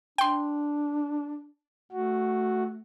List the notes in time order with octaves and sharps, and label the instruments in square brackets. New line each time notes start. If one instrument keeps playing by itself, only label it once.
[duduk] D4 [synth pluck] G5 C6
[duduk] A3 [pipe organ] F#4